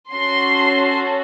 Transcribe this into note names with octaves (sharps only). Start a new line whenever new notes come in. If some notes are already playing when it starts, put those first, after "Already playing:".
C#4 F#4 A4 C6